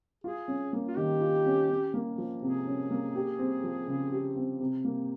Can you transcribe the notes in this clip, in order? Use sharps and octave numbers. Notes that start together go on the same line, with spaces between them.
F4 G#4
C#4
A#3
F4
D#3 G4
F4
C#4
C#4
A#3
F3
C3 G#4
C#4
A#3
G4
C4
F3
C#3
G4
C4
C3
A#3